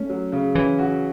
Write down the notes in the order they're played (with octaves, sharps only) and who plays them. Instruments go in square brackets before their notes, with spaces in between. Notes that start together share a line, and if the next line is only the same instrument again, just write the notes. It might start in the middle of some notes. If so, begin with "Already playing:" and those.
Already playing: [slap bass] A3 [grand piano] C#4
[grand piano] F#3
C#3
[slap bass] E3 [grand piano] C#4
[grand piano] F#4